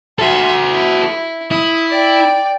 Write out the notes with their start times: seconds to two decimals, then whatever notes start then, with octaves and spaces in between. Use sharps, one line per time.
0.19 F#4 A4 E5 C6
0.71 E4
1.51 E4 D#6
1.90 D5 G5